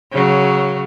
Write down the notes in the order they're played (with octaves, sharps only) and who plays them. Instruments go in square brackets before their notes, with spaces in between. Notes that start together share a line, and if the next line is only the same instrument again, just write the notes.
[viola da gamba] C#3 F#3